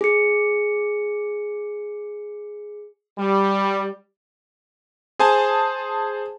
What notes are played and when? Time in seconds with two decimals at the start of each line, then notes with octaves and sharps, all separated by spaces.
0.01 G#4 C#7
3.18 G3
5.19 G#4 C5 G#5 A5